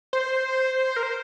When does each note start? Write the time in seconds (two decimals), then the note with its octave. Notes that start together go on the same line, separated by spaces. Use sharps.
0.13 C5
0.96 A#4
1.03 C5